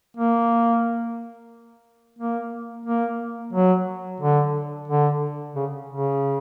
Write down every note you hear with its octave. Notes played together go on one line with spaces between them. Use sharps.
A#3
A#3
A#3
F#3
D3
D3
C#3
C#3